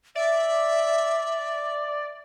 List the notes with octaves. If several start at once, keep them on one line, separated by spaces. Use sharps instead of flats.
D5 E5